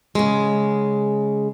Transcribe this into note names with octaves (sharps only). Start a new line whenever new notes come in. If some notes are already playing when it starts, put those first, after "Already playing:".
C#3 G#3